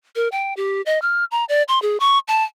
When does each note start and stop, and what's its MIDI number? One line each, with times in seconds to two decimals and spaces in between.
0.16 0.28 70
0.32 0.54 79
0.57 0.82 67
0.86 1.01 75
1.02 1.24 89
1.31 1.45 82
1.49 1.63 74
1.68 1.81 84
1.82 1.97 68
2.00 2.19 85
2.28 2.43 81